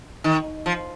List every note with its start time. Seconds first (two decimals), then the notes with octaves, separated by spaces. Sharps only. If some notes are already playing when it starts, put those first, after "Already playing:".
0.24 D#3
0.66 F3